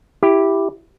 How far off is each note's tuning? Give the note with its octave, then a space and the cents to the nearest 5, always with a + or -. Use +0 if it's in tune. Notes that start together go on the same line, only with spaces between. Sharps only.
E4 +0 G4 +0